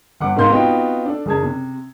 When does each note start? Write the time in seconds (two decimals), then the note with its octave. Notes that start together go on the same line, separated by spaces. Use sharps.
0.21 G1 F#5 D6
0.36 G#2 C3 A#4 F5 C6 G6
0.49 B3 C4 D#4 F4 F#4 G5
1.06 D4 A4
1.26 F#1 G#4 A5 G#6
1.43 C3